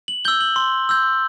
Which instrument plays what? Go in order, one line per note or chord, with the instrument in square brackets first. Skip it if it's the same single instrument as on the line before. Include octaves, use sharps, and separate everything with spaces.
[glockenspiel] F#7
E6 G6 G7
F#7
C6
E6 G6